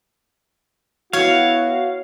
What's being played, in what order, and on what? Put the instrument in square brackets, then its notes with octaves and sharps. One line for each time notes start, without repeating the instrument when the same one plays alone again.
[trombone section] B3 E4 F#4 [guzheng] C#5 [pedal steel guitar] F5